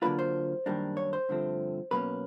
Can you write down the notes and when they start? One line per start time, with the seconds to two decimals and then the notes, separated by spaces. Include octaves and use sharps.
0.02 D3 F#3 A#3 D4 F4 B4
0.19 C5
0.66 F#2 D#3 G3 A#3 D4
0.97 C#5
1.13 C5
1.29 G2 D3 F3 A3 C4
1.91 B2 F#3 A#3 C#4 B4